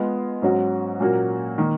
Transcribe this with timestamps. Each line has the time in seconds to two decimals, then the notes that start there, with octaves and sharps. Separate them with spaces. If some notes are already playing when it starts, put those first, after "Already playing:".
Already playing: G#3 B3 F4
0.42 G#2 F#3 C#4 F#4
1.00 A#2 F#3 A#3 C#4 F#4
1.58 D#3 A#3